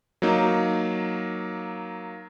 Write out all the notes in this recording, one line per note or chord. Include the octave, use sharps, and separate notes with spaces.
F#3 A#3 D#4